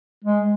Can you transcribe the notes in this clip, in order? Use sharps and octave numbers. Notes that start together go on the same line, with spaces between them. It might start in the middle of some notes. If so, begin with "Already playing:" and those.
G#3